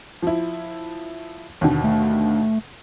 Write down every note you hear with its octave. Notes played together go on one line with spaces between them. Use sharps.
F3 E4
D#2 B2 D3
A3